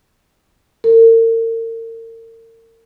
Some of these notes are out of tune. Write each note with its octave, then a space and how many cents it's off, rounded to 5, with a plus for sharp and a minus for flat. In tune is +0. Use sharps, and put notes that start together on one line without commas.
A#4 -40